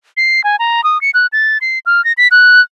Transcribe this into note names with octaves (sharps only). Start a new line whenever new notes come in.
C7
G#5
A#5
D#6
C#7
F#6
A6
C7
F6
A#6
B6
F#6